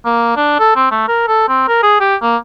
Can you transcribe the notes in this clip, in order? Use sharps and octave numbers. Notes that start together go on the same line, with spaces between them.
A#3
D4
A4
C4
A3
A#4
A4
C4
A#4
G#4
G4
A#3